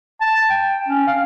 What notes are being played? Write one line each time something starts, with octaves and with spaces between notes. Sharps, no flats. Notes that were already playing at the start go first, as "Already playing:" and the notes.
A5
G5
C#4
F5